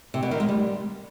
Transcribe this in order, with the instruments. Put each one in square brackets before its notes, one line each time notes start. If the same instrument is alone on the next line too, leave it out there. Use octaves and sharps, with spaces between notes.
[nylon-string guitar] C3
B2
D#3
G#3
G3